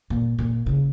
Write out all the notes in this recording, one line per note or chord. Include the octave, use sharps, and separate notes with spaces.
A#2
A#2
C#3